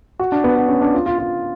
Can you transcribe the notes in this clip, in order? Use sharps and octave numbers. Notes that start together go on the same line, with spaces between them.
F#4
D4
B3
B3
C#4
D4
F4
F4
F4